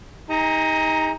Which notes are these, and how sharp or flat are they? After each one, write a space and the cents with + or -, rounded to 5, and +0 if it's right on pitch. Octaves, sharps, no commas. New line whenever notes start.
D#4 +25 G#4 -45 A#5 +0